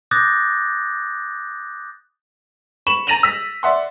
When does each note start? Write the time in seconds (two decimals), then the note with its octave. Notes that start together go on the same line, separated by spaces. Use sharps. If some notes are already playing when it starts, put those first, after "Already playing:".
0.11 D6 D#6 F#6 G6 A6 A#6
2.87 B5 C#6 E7 F#7
3.07 A#5 A6 A#6 D#7 F7 F#7
3.23 E6 A#6 B6
3.63 D5 E5 F#5 C6